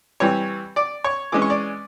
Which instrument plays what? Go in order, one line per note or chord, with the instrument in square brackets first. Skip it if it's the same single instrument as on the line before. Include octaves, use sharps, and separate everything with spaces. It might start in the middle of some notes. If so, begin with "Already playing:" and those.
[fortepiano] E3 G3 C4 C#5 C#6
D5 D6
C#5 C#6
E3 G#3 C#4 D6
C#6
D5 D6